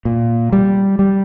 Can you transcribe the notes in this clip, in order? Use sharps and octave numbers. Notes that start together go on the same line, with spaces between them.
A#2
G3
G3